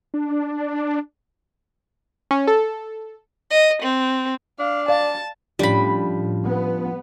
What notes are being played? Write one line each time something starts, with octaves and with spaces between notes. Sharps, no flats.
D4
C#4
A4
D#5
C4
D4 F5
D5 F5 A5
A2 F3 G3 C#4 D4 B5
B3